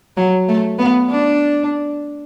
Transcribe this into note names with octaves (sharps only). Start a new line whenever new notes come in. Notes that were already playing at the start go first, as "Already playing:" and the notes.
F#3
A3
B3
D4